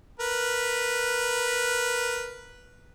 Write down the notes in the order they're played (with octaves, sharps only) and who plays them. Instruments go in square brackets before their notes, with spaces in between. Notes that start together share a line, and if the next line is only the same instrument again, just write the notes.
[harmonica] A#4 B4